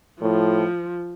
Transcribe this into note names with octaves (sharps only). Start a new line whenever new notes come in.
A2 F3